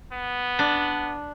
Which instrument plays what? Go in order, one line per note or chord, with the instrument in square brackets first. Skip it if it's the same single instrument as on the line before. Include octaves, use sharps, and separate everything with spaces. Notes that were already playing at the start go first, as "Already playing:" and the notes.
[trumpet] B3
[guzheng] D4